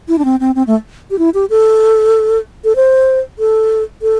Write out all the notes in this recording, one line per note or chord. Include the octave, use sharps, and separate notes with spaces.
E4
D4
C4
C4
C4
A3
G4
E4
G4
A4
A4
C5
A4
A4